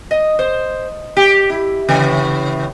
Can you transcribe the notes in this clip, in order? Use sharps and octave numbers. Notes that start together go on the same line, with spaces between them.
D#5
C5
G4
E4
A2 C#3 E3